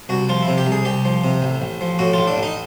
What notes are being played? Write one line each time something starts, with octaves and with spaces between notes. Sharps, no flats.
C2 F#4
F3 F4
E4
C3
G4
C2
G#4
C2 G4
F3
C3
A1
A1
F3
A2 F#4
A1 F4
D4
A1 D#4